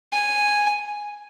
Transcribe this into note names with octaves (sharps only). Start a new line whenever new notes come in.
G#5